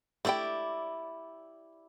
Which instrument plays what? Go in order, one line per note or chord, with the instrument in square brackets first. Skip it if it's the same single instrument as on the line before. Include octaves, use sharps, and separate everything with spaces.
[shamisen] A3 C5 G5 [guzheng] E4 G4 D5